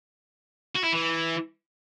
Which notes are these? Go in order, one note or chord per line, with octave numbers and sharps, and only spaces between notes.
F#4
E4
E3